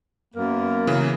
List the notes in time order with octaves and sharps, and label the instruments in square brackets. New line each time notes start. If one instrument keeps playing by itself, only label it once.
[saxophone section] F#2 B3 A#4 [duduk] A#3
[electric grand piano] C#3 E3